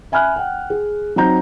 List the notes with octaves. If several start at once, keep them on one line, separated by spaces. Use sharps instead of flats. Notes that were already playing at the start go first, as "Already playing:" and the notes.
E5 G#5 B5 F6 F#6
F#5 G5
G#4
F#3 C4 D#4 A#5 G6